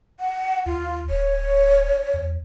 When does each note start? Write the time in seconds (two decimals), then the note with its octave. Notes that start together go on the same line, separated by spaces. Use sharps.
0.20 F#5
0.66 D#2 F4
1.10 D1 C#5
2.14 E2